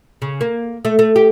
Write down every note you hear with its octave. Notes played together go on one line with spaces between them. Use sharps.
C#3
A#3
A3
A3
G4